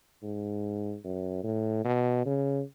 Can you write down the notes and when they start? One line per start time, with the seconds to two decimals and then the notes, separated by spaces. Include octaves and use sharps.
0.23 G#2
1.04 F#2
1.44 A2
1.85 B2
2.26 C#3